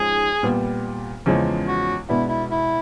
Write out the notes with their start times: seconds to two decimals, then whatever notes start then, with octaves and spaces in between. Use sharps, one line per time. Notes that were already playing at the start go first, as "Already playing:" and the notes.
Already playing: G#2 F3 G#3 C#4 G#4
0.43 A#2 G3 B3
1.26 E2 C#3 F3 G#3 C#4
1.67 F#4
2.08 B2 G#3 B3 D4 E4 F#4
2.29 E4
2.51 E4